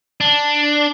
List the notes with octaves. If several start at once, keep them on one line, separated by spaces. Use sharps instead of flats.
D4